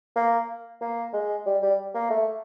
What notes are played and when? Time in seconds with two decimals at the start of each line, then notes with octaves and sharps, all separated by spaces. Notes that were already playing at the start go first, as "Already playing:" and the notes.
0.15 A#3
0.81 A#3
1.13 G#3
1.46 G3
1.62 G3
1.94 A#3
2.10 A3